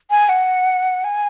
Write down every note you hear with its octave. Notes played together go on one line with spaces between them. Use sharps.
G#5
F#5
G#5